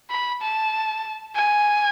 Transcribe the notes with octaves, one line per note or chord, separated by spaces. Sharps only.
B5
A5
G#5